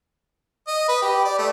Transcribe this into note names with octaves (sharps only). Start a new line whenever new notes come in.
D#5
B4
G4
D5
A3